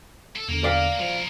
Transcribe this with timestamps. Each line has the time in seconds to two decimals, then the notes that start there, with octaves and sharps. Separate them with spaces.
0.36 A4
0.48 E2 D3 A#3 A#4
0.64 D5 F5
0.99 C#3 F3 A#4